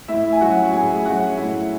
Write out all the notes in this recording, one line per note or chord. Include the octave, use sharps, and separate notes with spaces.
A2 E4 E5
G#5
F#3 C#4 F#4 F#5
A2 G#4 G#5
F#3 C#4 F#4 F#5
A2 E4 E5